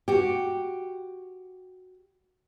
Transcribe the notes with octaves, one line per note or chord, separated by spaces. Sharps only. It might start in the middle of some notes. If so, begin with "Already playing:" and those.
F#4 G4